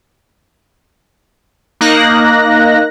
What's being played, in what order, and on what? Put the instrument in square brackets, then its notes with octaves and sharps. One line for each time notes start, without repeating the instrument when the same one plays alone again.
[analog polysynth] A#3 D#4 F#6 A#6